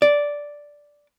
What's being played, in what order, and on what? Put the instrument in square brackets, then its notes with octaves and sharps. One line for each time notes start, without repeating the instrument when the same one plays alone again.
[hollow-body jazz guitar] D5